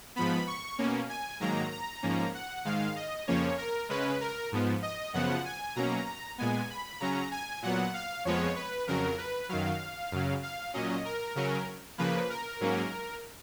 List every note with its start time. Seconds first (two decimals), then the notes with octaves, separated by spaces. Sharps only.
0.16 G#2 F3 B3 B5
0.47 C#6
0.78 B2 A#3 C#4
1.09 G#5
1.40 G#2 D#3 F#3 A#3 A#5
1.71 A#5
2.03 G#2 F3 A#3 C#4
2.35 F#5
2.65 G#2 D#3 G#3 F5
2.96 D#5
3.27 F2 C#3 F3 A#3 C#4 C#5
3.58 A#4
3.89 C#3 G#3 C#4 B4
4.21 A#4
4.52 G#2 F3 B3
4.82 D#5
5.13 F#2 C#3 F3 B3 F#5
5.45 G#5
5.76 B2 F#3 A#3 C#4 A#5
6.38 A#2 G#3 B3 G#5
6.70 B5
7.00 C#3 F#3 C#4 A#5
7.31 G#5
7.62 A#2 F#3 B3 F#5
7.94 F5
8.25 F2 F3 G#3 B3 C#5
8.56 B4
8.87 F2 C#3 F#3 A#4
9.18 B4
9.49 F#2 D#3 F#3 F5
10.12 F#2 C#3 F#3
10.43 F5
10.74 A#2 F#3 C#4 D#5
11.05 A#4
11.35 C#3 F#3 C#4 A#4
11.98 C#3 F3 A#3 B4
12.30 A#4
12.60 G#2 F#3 A#3 C#4